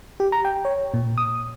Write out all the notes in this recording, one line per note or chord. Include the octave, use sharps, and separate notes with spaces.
G4
A#5
G5
C#5
A#2
D#6